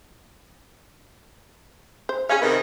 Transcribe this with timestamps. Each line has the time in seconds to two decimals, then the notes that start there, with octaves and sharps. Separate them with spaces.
2.09 C5
2.29 C#4 G#4 F5
2.42 C3 D#3 B4